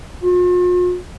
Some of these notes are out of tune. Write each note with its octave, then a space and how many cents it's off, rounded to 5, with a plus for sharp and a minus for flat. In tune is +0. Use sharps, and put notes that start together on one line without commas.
F4 +45